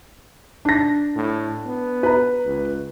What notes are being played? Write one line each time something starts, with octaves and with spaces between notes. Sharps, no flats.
D4 A#6
A2
B3
B4 A#5
C#2